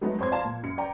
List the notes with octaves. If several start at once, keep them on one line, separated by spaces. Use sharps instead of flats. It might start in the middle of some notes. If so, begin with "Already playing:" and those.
D#3 F#3 G#3 A3 B3 D#4
F2 C5 C#5 C6 G#6
D5 F5 A5 A#5 C6
A#2
F#2 C#7
D5 G5 G#5 A#5